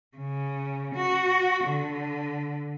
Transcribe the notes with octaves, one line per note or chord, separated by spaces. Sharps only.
C#3
F#4
D3